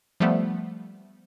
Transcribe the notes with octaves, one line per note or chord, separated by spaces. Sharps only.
F3 G3 A3 B3